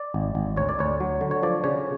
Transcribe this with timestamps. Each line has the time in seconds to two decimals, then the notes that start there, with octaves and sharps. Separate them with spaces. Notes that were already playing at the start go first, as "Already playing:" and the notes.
Already playing: D5
0.14 G#1
0.35 G#1
0.56 D2 C#5
0.69 D5
0.79 D2 C#5
1.00 F#3
1.21 D3
1.31 C#5
1.43 F3 D5
1.64 C#3 C#5